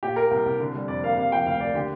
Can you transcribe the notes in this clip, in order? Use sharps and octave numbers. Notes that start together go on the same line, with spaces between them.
A#2 G4
A#3 A#4
C2
C2
D3
G3
F2 D5
A#3 F5
C3 F5
F3 G5
D2 F5
A#3 D5
D3 G4